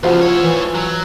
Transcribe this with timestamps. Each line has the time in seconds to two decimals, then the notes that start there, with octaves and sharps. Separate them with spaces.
0.03 E2 C#3 F3 F#4 C5
0.21 E4 C#5
0.42 E3
0.75 F#3